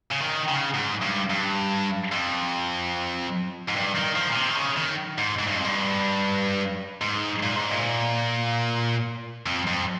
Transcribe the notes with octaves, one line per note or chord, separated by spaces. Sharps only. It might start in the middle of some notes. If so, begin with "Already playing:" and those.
C#3
D#3
C#3
G#2
G2
G2
F2
G#2
G2
D#3
F3
A#2
C3
D#3
C#3
D#3
G#2
G#2
G2
F2
G2
G#2
A#2
G#2
A#2
F2
F2